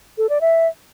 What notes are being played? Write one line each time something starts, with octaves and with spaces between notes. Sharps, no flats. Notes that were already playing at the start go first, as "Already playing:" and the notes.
A4
D5
E5